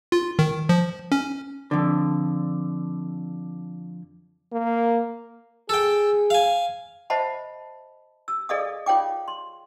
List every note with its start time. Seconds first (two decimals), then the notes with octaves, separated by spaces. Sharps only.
0.12 F4
0.39 D#3
0.69 F3
1.12 C#4
1.71 F2 D3
4.52 A#3
5.69 G#4 A4 G5
6.30 F5 G#5
7.10 C5 D#5 E5 F#5 A5 B5
8.28 E6
8.49 G#4 A4 D5 D#5 F5 D#6
8.86 F4 C#5 F5 G5 D6
9.28 C6